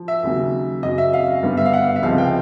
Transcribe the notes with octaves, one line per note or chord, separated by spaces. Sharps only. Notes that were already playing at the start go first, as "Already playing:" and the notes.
Already playing: F3
E5
D#2 C#3 F#3 A#3
F#2 C#3 F#3 D#5
E5
F5
G2 D3 G3 B3
E5
F5
F#5
E5
C#2 C3 F3 G#3 F5
G5